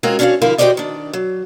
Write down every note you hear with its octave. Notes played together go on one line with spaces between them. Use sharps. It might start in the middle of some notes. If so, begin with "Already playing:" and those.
G#3 C4 C#4 F4 F#4 A#4
C#4 D4 F#4 C5 C#5 F5
D3 F3 E4 A#4 F5
F#4 G4 B4 C5 D5 D#5
D#3 D4
F#3